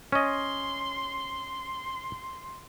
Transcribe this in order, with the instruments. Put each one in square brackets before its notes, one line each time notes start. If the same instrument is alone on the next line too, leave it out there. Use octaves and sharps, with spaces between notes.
[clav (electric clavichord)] C#4 D#5 [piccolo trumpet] C6